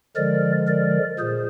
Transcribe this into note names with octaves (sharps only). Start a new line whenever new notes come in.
D3 F3 G#3 A#4 D5
A#4 D5
A#2 G#4 C5